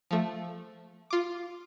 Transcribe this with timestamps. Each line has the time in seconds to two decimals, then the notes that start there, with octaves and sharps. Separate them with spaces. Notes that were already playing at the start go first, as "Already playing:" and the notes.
0.11 F3 A3
1.10 F4 D6